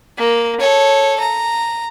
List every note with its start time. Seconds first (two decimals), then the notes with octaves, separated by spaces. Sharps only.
0.18 A#3
0.60 A4 C#5
1.20 A#5